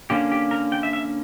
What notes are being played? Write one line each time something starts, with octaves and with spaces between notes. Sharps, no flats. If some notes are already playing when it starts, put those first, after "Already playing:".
D3 A#3 C#4 G4
G4
A#4
G5
E5
E5